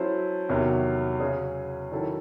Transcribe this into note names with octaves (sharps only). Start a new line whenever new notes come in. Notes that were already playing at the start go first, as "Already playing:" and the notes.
Already playing: F#3 C#4 E4 A4 C5
E2 C3 D#3 F#3 C#4
C#3 F#3 C#4 G#4
D#3 F#3 C#4 E4 A4